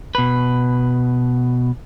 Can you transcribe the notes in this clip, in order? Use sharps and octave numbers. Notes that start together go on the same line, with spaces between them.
B2 B4